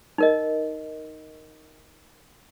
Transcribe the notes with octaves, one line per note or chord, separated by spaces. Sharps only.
D#4 A#4 D#5